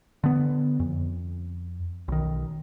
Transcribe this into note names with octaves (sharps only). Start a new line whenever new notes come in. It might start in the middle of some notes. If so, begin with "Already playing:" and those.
D3 B3
F2
B1 D#3